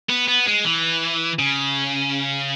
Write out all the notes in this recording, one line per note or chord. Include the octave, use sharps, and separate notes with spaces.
B3
B3
G#3
E3
C#3